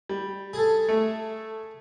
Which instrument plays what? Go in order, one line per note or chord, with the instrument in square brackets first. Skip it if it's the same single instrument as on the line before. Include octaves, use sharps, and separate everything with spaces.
[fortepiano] G3
[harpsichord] G#4 A4
[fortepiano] A3